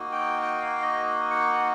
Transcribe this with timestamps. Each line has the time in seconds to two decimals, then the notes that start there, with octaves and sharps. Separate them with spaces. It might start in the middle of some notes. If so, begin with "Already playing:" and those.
Already playing: A#3 D#4 F#4
0.12 G5
0.42 G5
0.62 F5
0.82 D#5
1.31 F#5